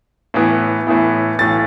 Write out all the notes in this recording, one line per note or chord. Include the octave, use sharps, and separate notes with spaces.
A2 E3 B3 E4
A2 E3 B3 E4
B1 A2 E3 A6